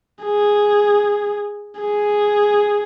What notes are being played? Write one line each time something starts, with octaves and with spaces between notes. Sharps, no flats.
G#4
G#4